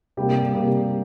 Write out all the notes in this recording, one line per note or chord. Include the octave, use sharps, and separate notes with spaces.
C3 G3 A#3 G4
C3 G3 A#3